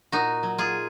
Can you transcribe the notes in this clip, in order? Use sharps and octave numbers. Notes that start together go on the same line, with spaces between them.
A#2 D#4 F#4
F#3
F4 G#4